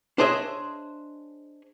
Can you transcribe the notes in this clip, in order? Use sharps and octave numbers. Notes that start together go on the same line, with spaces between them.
D4 G#4 C5 C#5 D#5 E5